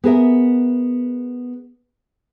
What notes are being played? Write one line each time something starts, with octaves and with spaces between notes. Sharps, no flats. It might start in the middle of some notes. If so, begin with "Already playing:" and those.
B3 G#4 A#4 E5